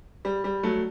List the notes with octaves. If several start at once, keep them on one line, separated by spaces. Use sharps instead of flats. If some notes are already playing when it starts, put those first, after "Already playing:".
G3
G3
F#3 A3